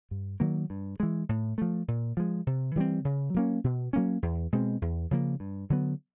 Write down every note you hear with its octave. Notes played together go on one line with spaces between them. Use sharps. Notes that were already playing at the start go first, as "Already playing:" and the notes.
G2
D#3 F#3 A#3
G2
E3 G#3
A2
F3 A3
A#2
F3 G#3
C3
E3 G3 C4
C#3
F#3 A#3 C#4
B2
F#3 A#3 C#4
E2
B2 G#3 C4
E2
C#3 F3 A#3
G2
D3 F#3 B3